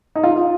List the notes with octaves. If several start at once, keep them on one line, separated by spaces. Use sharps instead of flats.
D#4
F4